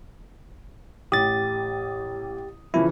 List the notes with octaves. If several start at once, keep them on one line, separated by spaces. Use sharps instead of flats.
A1 G4 D#6 A6
C#3 E3 F3 E4